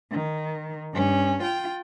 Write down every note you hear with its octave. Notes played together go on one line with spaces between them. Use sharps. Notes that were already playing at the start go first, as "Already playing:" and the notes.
D#3
G2 C#4
F4 G5